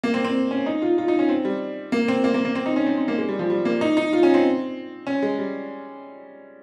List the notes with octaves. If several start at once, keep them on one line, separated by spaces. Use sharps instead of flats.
A#3
C4
C4
C#4
D#4
F4
F4
D#4
C#4
C4
G3
A#3
C4
A#3
A#3
A#3
C4
D#4
C#4
C4
C4
A#3
G#3
G3
F3
G3
A#3
D#4
D#4
F4
C#4
C4
C#4
G#3
G3